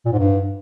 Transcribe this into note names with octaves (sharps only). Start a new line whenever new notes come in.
A#2
G#2
G2